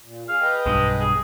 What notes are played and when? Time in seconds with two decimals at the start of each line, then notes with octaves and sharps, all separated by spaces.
0.02 A#2
0.29 G#4 F5
0.41 B4 D#5 G5
0.66 B1 G2 G#3
1.00 G#4